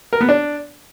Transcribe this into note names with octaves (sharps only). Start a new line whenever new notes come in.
A#4
B3
D4